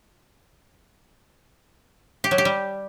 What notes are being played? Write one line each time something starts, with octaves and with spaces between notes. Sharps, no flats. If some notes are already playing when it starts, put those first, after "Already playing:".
G4
F#3
G4
G3